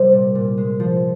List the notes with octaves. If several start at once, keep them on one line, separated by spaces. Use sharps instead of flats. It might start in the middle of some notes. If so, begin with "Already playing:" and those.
Already playing: C3 G3 C5
A#2
A#2
G#3
F3